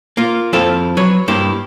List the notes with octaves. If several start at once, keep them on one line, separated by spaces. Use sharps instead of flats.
A#3 F4
F2 C4 E4 A4 F5
F#3 B4 C#5
G2 A#3 E4 G4